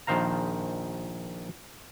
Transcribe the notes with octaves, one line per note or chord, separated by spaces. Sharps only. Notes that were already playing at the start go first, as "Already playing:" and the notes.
A#1 D#3 C5 F5 A#5